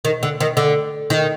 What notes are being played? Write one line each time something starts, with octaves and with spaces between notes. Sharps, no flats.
D#3
D3
D#3
D3
D#3